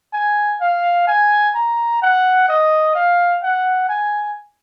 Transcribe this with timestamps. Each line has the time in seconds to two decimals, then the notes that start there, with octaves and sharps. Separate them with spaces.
0.13 G#5
0.61 F5
1.07 G#5
1.55 A#5
2.02 F#5
2.49 D#5
2.95 F5
3.43 F#5
3.89 G#5